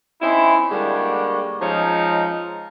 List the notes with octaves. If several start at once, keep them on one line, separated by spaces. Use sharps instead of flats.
C4 C#4 D#4 E4
D3 G3 G#3 A#3 F#4 G4
F3 G#3 C4 C#4 D#4